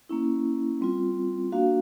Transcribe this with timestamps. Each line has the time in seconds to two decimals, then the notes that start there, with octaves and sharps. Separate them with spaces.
0.09 A#3 C#4 E4
0.81 G3 C4 F4
1.52 A#3 D4 F#4 F5